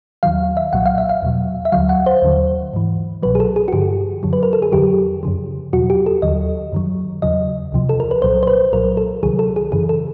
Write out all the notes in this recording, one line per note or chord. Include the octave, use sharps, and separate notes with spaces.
D#2 D#3 F#3 F5
E5
C2 A#2 F#3 F#5
F5
E5
F5
E2 B2 F#3
E5
D2 D3 F#3 F5
F#5
C5
D#2 D3 F#3
G#2 E3
C2 B2 F#3 B4
G#4
A4
G#4
F#4
G2 D3 F3 G4
F#2 D3 F#3
B4
A#4
A4
G#4
F2 D3 F#3 G4
F#2 C#3 F3
E2 B2 F#3 F#4
G4
A4
D#2 D3 F#3 D#5
F#2 D#3 F#3
E2 C#3 F#3 D#5
C#2 C3 F3
A4
A#4
B4
C2 A#2 F#3 C5
C5
B4
C2 A#2 F#3 A#4
A4
C#2 C3 D#3 F#3 G#4
A4
G#4
F#2 C#3 E3 G#4
A4